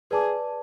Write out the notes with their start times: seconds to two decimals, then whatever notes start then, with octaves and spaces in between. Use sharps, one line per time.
0.11 G#4 B4 D5 A5 D6